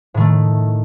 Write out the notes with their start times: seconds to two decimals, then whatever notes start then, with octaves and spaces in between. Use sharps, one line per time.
0.14 A2
0.17 D#3
0.20 A3